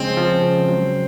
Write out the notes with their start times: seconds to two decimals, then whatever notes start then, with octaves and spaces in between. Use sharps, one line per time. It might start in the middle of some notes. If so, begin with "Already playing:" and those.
Already playing: C#3 F3 G#3 C4 C#4
0.17 F3
0.42 C#3
0.68 F#3